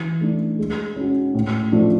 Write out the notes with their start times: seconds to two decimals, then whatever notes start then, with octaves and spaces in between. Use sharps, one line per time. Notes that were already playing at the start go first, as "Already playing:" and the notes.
Already playing: E3
0.21 A3 D4
0.59 G#3
0.96 C#4 F#4
1.34 A2
1.72 F3 A3 D4